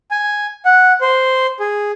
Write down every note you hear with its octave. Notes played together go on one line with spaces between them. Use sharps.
G#5
F#5
C5
G#4